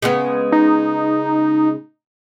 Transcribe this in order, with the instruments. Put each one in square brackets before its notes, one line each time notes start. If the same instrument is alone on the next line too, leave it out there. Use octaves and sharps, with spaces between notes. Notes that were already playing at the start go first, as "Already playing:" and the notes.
[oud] C#3 G#3 B3
[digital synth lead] D#4